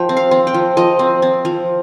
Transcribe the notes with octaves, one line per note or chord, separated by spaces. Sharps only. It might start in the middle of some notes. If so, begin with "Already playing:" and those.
Already playing: F3 G5
C4
F5
C4
G5
F3
F3 D#5
C4
C4
F3